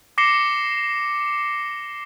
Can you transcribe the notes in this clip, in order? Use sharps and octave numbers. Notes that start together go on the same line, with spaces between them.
D6 A#6 C7 C#7 E7 G7